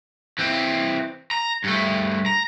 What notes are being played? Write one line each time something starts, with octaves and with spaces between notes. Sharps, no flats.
E3 C4
A#5
G2 A3
A#5